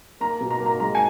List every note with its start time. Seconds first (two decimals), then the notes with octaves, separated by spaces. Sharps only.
0.20 A#3 A#5
0.40 B2
0.50 A#5
0.60 A#3
0.66 A#5
0.80 G#3 A#5
0.95 G#5